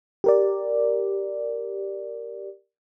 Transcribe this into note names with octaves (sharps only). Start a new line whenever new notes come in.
G4 A#4 D5